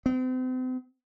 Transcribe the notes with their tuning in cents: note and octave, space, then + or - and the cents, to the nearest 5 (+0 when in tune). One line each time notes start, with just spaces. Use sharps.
C4 -40